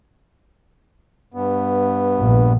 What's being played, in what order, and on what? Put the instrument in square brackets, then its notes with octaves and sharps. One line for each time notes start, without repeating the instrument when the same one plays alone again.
[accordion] G2 B3
[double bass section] A#1